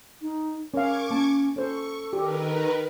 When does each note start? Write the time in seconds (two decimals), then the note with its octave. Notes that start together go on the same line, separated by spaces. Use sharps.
0.22 D#4
0.74 C#4 A#4 F5 C#6 D6 G#6
1.11 A#3 C#4 A5
1.56 C#4 A4 C5 C#6
2.13 D#3 G4 A#4 B4